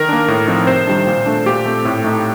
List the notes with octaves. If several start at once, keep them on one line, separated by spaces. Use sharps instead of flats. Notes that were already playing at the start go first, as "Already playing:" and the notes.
Already playing: D#3 A#4
A#3 D4
A2
F3 C4 D#4
C3 C5
D#3 G3 D4
A#2
A3 D4
A#2 G4
A3 C4
A2
A3 D#4